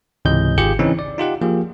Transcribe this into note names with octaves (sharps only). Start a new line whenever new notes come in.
C#2 G#2 C3 E3 D#5 G6
G#1 F4 G4 G#4 G6 C#7
C#3 E3 C4 C#4 D#4
D5
D#4 F4 G4 F#5
F3 A#3 F4 G4 G#4